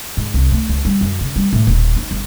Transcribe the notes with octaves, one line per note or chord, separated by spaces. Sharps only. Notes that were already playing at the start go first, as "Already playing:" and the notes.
G#2
C2
A3
C#2
G3
F#2
C#3
G3
A2
D#1
D#4
G1